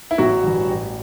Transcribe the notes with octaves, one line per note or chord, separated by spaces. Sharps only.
E4
A1 F#3 F#4
G2 E3
A1